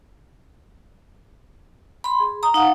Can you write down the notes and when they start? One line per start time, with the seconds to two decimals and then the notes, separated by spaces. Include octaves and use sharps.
2.04 B5 C6
2.20 G#4
2.43 A#5 D#6
2.54 D#4 F5 F#5